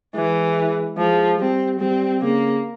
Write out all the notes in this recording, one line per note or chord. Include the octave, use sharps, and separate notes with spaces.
E3 G#3
F3 G#3
G3 C4
G3 C4
C#3 A#3